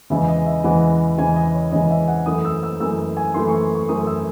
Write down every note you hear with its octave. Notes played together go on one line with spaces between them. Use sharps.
E2 C#3 E3 G#3 E5
D#5
E5
E2 C#3 E3 G#3 F#5
E2 C#3 E3 G#3 G#5
D#5
C#5
E2 C#3 E3 G#3 D#5
E5
F#5
F#2 E3 A3 D#6
E6
E6
F#2 E3 A3 E6
G#5
F#2 E3 A3 C6
C#6
C#6
F#2 E3 A3 D#6
E6